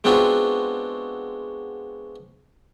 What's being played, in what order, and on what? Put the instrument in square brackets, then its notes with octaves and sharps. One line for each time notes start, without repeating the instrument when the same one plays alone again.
[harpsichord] G#3 B3 C4 D4 F4 F#4